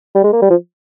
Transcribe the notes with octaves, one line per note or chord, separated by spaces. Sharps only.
G3
G#3
A#3
G3
F3